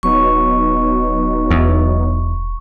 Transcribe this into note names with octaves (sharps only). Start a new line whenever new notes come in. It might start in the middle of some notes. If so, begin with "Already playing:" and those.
D#1 F#3 B3 D#4 C#6
E2